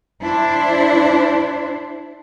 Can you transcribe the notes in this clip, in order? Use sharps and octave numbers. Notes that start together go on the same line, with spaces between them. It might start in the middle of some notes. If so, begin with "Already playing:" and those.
D4 E4 C5